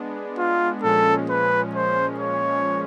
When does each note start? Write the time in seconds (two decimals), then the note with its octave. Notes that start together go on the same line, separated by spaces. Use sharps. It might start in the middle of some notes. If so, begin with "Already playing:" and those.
Already playing: G#3 B3 D4
0.38 F4
0.83 A#2 F3 G#3 C#4 A4
1.29 B4
1.75 C5
2.20 C#5